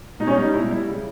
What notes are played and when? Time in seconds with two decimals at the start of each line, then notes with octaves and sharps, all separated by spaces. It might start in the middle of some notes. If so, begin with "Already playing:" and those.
0.20 B2 D#4
0.27 C#4
0.31 D#4
0.37 G3
0.42 D#4
0.53 B2 E4
0.71 G3 E4
0.88 C#3